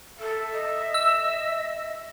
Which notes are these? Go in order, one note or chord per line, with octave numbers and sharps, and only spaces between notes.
A4 E5
D#5
E6